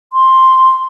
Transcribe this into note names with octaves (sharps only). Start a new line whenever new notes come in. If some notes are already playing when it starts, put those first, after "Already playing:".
C6